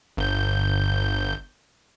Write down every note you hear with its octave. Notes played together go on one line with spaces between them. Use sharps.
G1 G6